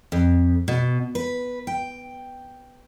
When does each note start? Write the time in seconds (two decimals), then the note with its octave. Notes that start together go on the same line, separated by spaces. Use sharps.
0.12 F2
0.68 B2
1.15 B4
1.67 G5